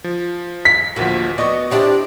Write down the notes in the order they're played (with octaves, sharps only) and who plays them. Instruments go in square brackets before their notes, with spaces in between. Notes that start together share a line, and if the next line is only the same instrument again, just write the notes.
[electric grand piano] F3
[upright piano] B6
[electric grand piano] A1 D2 F3 [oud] A#3 F#4
[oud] B3 F#4 [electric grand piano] D5 D#5 C#6
[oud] C4 D4 E4 [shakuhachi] G4